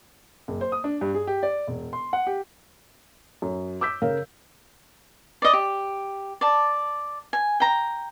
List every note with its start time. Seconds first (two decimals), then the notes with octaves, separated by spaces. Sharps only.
0.48 F#1
0.61 C5
0.72 D#6
0.84 D4
1.01 G2
1.15 G#4
1.27 G4
1.43 D5
1.67 E1
1.93 C6
2.13 F#5
2.27 G4
3.42 F#2
3.81 D6 E6 G6 B6
4.02 C#3 A#4 F5
5.42 D5 D#5
5.53 G4
6.41 D5 A5
7.33 G#5
7.60 G5 A#5